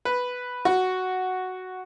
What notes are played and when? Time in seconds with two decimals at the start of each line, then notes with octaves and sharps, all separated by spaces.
0.05 B4
0.65 F#4